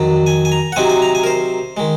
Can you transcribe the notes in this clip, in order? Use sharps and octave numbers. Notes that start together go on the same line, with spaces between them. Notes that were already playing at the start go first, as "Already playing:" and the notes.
Already playing: F2 D#3 F#3
G#5
G#5
A#5
F#5
C3 F#3 C4 D#4 G#5
G#5
A#5
G#5
A#4
C5
D#3 G#3